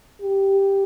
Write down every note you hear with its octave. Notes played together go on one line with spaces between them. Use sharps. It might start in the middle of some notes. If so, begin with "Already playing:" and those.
G4